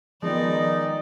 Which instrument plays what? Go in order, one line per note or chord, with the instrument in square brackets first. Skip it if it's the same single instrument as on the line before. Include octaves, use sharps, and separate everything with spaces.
[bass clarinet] D#3 [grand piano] F3 G#3 B3 [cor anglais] D#4 [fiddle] D5